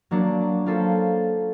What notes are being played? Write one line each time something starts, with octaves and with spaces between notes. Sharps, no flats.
F#3 A#3 D4
A#3 C#4 F4 A4 C5